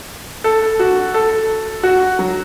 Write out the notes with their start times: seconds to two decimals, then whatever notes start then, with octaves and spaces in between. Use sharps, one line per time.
0.44 A4
0.79 F#4
1.14 A4
1.83 F#4
2.19 F#3